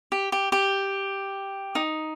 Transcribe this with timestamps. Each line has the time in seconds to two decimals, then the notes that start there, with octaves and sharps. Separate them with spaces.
0.12 G4
0.32 G4
0.52 G4
1.75 D#4